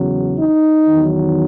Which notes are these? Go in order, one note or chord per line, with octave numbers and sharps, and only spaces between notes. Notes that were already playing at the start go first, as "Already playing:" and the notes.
Already playing: E2 C#3 F#3
D#4
E2 D#3 F#3